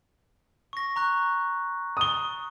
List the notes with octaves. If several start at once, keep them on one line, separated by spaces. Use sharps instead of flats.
C#6 A#6
A#5 C#6 F#6
D#6 G7